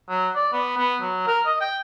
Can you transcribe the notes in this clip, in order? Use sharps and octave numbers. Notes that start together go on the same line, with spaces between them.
F#3
D5
B3
B3
F#3
A#4
D#5
G5